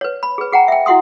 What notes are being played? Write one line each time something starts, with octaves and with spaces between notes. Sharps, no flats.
B4 C#5
B5
G#4 B4
G#4 F#5 G5 A#5
E5 G5
E4 F#4 F#5 C6 D#6